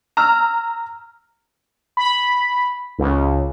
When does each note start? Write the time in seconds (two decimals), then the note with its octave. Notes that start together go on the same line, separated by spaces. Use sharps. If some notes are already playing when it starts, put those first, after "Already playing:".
0.17 A#5 E6 F6
1.97 B5
2.98 C#2